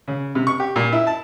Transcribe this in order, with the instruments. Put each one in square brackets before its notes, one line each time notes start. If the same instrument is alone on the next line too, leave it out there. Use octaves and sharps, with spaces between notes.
[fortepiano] C#3
C3
C#6
G4
A#2
E4
A5